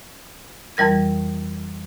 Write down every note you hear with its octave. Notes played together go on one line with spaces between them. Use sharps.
F2 E3 G3 A#4 G#6